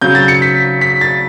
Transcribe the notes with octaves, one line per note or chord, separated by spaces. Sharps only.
C#3 F#3 G6
A6
C#7
B6
B6
A6